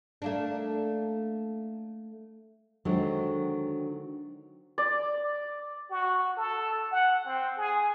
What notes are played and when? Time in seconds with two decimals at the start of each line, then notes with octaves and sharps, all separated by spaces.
0.22 A3 A#3 D4
2.85 D3 D#3 F#3 G#3 C4
4.78 D5
5.91 F#4
6.37 A4
6.91 F#5
7.25 C4
7.58 G#4